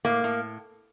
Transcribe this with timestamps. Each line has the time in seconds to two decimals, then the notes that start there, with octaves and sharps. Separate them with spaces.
0.05 A2 A#3
0.24 A2